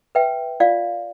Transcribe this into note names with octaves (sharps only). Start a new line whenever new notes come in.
B4 E5 G5
F4 D5 F5